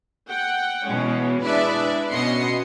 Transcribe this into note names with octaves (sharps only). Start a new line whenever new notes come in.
F#5 G5
B2 E3 G#3 C#4
G#3 D4 E4 B4 D5 E5
B2 B3 C#4 D#5 C6 C#7